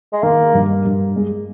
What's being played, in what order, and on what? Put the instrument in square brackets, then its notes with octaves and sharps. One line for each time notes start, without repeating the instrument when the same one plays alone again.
[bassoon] G#3
[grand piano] D#3 [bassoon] A#3
[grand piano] G2
G2
G#3